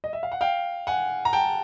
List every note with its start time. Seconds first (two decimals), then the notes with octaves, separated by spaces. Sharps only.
0.04 D#5
0.13 E5
0.23 F5
0.32 F#5
0.41 F5 G5
0.87 F#5 G#5
1.25 A#5
1.33 G5 A5